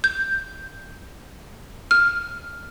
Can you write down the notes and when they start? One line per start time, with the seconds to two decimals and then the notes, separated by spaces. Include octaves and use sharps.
0.04 G6
1.91 F6